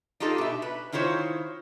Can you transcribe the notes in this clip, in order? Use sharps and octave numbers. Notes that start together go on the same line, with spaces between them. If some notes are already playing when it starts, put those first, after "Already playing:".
D4 D#4 F4 G4 A4
B2 E5
B4
D#3 E4 F4 C5 C#5